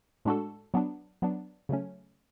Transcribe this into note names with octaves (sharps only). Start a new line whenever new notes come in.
A2 G#3 D4 F#4 A4
F#3 B3 D4
F#3 B3 D4
C#3 F#3 A3 C#4